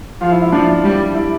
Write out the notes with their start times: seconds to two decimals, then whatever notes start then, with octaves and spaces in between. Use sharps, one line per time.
0.21 F3 F4
0.31 E4
0.42 E4
0.52 F3 D4
0.84 G3
1.15 E4